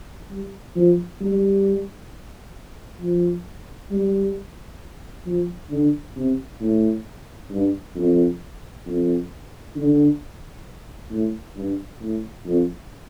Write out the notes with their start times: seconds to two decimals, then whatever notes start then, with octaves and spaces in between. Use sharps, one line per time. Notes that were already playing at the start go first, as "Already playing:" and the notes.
0.31 G3
0.76 F3
1.21 G3
3.01 F3
3.91 G3
5.26 F3
5.71 D3
6.16 C3
6.61 A2
7.50 G2
7.96 F2
8.86 F2
9.76 D3
11.10 A2
11.56 G2
12.01 A2
12.46 F2